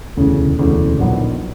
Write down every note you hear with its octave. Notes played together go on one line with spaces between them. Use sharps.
E1 D2 C#3 E3
E1 D2 C#3 E3
A#1 A#2 F#3 B3 D#4